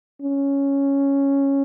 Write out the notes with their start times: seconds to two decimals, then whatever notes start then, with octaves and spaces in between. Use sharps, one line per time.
0.22 C#4